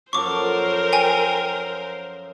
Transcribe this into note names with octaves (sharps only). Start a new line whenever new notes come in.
F#2 F3 A4 A#4 C5 C#6 D6
G5 G#5